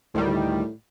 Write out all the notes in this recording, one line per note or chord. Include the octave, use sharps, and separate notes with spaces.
D2 A2 D#3 G3